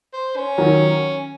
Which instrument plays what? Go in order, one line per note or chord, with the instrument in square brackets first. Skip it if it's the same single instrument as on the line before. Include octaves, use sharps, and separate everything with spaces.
[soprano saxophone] C5
C#4
[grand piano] D#3 F#3